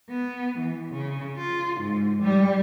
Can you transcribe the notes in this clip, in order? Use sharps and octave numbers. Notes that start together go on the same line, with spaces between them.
B3
E3
C#3
F4
G#2
G3